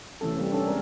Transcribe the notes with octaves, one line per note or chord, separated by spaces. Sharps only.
C3 E3 A3 C#4 A4
G3 A#3 C4
C#4 D4 A4
G#3 C4 A#4